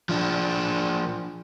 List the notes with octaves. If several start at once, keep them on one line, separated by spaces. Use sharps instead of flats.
F3 D4